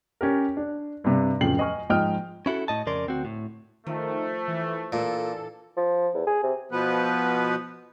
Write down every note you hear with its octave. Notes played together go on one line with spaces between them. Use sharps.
C#4 G4 A#4
D4
G2 C3 D5
D1 F2 C#3 G5 C7 F#7
B4 D#5 G#5 C#6 F6
G#2 F3 D#5 G5 D#6 F6
C#4 E4 F#4 A4
A2 D#5 A5
F2 C#3 A#4 D5 C6
D2 C4 F#4
A2
D#3 F3 A3
E3
A#2 E3 D4 A4
F3
E2
G#4
C3
B2 F3 B3 B4